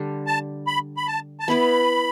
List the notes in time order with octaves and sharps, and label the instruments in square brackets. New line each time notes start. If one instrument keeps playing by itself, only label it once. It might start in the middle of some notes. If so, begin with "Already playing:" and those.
Already playing: [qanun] D3 G3 D4
[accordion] A5
B5
B5
A5
A5
[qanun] B3 E4 B4 [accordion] B5